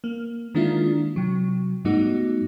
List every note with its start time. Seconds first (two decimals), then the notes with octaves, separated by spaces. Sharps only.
0.04 A#3
0.55 D#3 G#3 A#3 D4 E4 F4
1.16 C3 F#3
1.85 G#2 G3 A3 B3 D#4 F#4